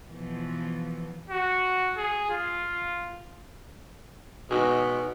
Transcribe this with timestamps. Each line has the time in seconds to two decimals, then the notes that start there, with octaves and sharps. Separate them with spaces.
0.10 B2 E3 F3
1.30 F#4
1.98 G#4
2.30 F4
4.51 B2 D#4 F#4 G#4